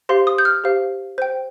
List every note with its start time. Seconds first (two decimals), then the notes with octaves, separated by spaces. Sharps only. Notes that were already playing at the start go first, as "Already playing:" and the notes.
0.09 G4 C5 F5 C6
0.27 D#6
0.38 G6
0.45 F6
0.64 G4 C5 F5
1.18 C5 G5